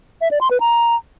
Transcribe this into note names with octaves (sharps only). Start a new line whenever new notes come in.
E5
D5
C6
B4
A#5